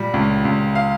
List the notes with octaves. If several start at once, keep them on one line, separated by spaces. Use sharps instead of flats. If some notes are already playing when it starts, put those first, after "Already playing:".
Already playing: A#2 G3
C#2
C#2
F5